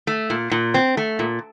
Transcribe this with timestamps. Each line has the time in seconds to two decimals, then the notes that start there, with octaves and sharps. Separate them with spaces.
0.07 A3
0.30 A#2
0.51 A#2
0.74 C4
0.97 A3
1.19 A#2